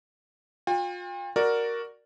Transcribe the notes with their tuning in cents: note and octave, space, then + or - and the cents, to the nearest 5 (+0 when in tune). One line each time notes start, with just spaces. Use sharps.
F4 +35 G5 +40
F#4 +0 A#4 +0 D5 +0